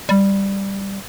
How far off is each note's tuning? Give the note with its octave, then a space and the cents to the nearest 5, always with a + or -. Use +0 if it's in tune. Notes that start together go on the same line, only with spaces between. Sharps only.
G3 +5